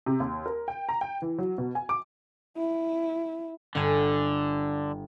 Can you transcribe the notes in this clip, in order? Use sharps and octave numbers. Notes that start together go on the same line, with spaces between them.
C3
D#2
A#4
G5
A#5
G5
E3
F#3
B2
G#5
D6
E4
G1 D3 G#5